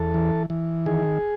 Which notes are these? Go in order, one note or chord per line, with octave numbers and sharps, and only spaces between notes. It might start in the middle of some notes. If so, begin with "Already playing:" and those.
Already playing: E2 A4
E3
E3
D#3 G#4